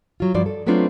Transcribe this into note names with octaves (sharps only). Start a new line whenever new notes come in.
F#3 F4
G2 F3 F4 F#4 D5
A4
F#3 A3 B3 C4 D4 F4